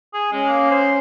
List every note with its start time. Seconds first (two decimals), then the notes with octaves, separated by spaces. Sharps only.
0.14 G#4
0.32 G#3 C#4
0.48 A#3
0.70 C5